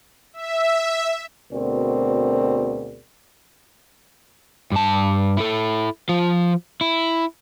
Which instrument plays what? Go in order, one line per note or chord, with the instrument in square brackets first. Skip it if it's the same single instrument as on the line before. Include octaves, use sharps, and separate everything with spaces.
[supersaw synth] E5
[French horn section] D2 B2 C4 G#4 A#4 D5
[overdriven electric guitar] G2 A5
E4 A4
F3 F4
E4